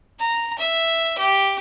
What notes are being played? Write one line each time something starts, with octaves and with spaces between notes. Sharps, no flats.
A#5
E5
G4